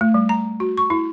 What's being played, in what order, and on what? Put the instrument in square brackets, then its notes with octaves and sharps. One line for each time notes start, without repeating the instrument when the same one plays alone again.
[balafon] A3
G3
A#5
F#4
C#6
E4